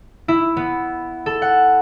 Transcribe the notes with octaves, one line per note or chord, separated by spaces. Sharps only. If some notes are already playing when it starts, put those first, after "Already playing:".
E4
B3
A4
F#5